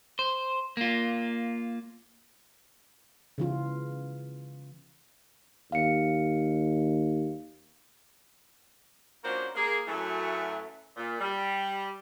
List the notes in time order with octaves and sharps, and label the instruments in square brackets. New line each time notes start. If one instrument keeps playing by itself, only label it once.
[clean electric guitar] C5
A#3 F4
[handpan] C#3 E3 F4
[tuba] D#2 [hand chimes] F5 C#7
[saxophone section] F3 A#3 C#4 D4 F#4 C5
A#3 G#4
F#2 E3 F#3 A3
A#2
G3